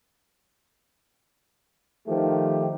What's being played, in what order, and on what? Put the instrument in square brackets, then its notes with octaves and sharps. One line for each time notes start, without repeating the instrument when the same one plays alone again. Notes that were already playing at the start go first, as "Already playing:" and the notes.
[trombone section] D#3 F3 A3 G4